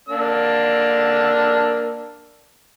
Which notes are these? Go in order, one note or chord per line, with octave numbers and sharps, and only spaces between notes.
A#3 D4 E6